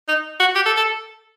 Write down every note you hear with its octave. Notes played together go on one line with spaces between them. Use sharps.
D#4
F#4
G4
A4
A4